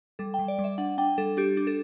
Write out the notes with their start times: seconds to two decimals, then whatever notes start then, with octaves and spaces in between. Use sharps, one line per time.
0.19 G3 A4
0.34 G5
0.39 G3
0.48 D5
0.59 G3
0.64 E5
0.78 D4 F#5
0.98 D4 G5
1.18 G3 A4
1.37 D4 G4
1.57 D4
1.67 A4